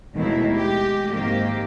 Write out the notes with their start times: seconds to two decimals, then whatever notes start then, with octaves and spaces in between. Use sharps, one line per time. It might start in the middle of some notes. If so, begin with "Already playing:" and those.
0.14 D#2 B2 D#3 G#3 A3 E4
0.55 G#3 G4
1.09 G#2 D#3 A#3 C4 G4